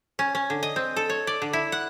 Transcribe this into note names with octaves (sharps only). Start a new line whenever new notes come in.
C#4
C#4
D3
D#5
C4
A4
C#5
D5
D3
E4
F#5